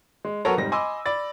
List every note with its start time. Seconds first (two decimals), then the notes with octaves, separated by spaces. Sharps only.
0.25 G#3
0.45 F#3 B3 A4 A#4 C#5 A#5
0.57 F1 G#2 G3 A#6
0.72 D#5 G#5 B5 C6 D6 E6
1.06 D5 B5 A6